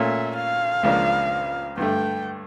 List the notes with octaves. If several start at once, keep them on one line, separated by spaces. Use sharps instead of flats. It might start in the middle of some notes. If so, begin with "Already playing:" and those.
Already playing: A#2 A3 C#4 E5
F5
C#2 C#3 F3 A#3 D4
G2 D3 A3 G5